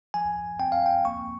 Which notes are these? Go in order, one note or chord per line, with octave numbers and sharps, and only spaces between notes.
F3 G#5
C4 G5
F5
G5
A#3 C#6